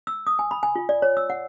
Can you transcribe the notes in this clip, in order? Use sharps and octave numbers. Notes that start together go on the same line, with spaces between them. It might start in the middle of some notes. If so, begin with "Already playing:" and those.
E6
D#6
G#5
B5
G#5
F4
D5
C#5
E6
F#5